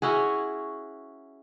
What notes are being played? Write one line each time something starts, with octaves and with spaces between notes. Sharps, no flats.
C#4 E4 F#4 G#4